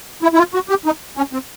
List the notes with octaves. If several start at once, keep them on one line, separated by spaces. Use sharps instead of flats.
E4
E4
F4
F#4
G4
D#4
C#4
C4